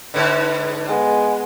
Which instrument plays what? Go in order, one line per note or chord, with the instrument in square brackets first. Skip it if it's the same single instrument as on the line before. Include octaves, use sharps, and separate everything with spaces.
[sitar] G#2 D3 [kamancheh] B4
[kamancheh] G#3 B3